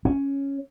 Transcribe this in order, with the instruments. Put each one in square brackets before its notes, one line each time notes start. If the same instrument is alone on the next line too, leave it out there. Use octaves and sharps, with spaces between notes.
[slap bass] C#4